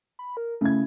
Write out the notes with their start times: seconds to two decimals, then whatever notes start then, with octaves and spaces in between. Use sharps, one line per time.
0.19 B5
0.37 A#4
0.61 C#3 A3 E4 G#6